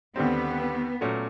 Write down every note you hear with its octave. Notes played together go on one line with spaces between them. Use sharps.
D#2 D3 G3 B3 C4
A#2 F#3 A3 C#4 F#4